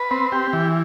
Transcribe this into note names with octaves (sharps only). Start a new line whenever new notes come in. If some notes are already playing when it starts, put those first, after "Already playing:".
Already playing: B4
C4
G4
E3